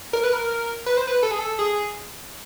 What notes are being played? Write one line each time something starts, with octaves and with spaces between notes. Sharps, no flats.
A#4
B4
A#4
B4
C5
B4
A4
G#4
A4
G#4